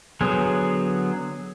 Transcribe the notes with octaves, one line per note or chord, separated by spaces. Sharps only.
D3 F#3 B3 G#4 C5